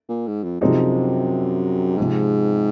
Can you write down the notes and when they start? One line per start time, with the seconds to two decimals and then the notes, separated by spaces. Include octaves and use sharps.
0.09 A#2
0.27 G#2
0.44 F2
0.61 F#2 C3 F3 C4 D#4 G#4
1.97 G#2 C3 F3 G#3